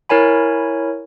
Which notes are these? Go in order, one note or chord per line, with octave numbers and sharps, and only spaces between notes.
E4 A#4 C#5 G#5 B5